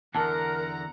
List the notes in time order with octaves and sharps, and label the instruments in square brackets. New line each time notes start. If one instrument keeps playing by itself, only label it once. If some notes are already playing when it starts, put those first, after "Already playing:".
[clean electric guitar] E2 D3 [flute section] A#4 [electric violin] F#5 A#5 [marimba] A5